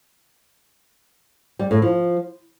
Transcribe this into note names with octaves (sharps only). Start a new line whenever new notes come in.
G3
A2
F3